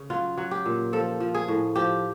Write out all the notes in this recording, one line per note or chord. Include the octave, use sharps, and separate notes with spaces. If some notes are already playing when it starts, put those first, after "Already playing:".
Already playing: C#3
F#3 F4
F#3
G4
A#2
F3 A4
F3
G#4
A2
F3 G4